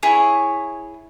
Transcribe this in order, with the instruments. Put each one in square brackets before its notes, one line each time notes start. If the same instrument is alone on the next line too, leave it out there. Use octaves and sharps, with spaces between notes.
[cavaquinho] E4 G#4 C#5 C#6